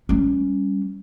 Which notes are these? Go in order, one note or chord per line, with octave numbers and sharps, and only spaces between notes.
G3 C#4